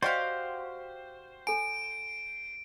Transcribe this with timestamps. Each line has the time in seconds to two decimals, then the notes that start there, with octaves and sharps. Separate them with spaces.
0.03 F#4 G4 C5 D5 D#5 F5
1.47 A4 G#5 D7